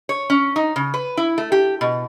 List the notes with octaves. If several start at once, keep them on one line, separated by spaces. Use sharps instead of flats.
C#5
C#4
D#4
C#3
B4
E4
A3
G4
B2